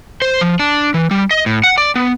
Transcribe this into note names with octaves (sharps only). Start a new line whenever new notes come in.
C5
F3
D4
E3
G3
D#5
A2
F#5
D5
B3